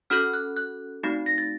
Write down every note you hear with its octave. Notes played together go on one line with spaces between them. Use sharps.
C#4 F#4 A4 F6
F#6
F#6
A3 C4 D#4 F#4
A#6
A6